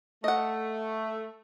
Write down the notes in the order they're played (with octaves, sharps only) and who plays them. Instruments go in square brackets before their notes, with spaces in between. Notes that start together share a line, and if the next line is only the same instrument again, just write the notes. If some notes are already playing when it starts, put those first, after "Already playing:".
[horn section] A3 [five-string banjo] D#5 F#5